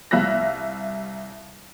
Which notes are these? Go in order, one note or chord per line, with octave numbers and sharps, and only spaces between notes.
C2 E5 F5 F#6 A#6